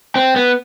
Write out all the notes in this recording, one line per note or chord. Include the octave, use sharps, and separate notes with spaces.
C4
B3